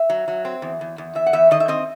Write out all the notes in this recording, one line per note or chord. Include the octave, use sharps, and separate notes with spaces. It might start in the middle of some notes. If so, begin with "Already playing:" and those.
Already playing: E5
F#3
F#3
C4
E2
E2
E2
E2 E5
F#5
E2 E5
D#3 D#5
E5
C4 D#5